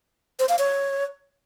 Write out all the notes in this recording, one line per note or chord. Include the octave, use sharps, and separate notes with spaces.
C5
F5
C#5